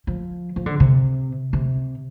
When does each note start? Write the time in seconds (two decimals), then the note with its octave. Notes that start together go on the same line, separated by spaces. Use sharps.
0.07 F3
0.56 F3
0.66 D3
0.80 C3
1.53 C3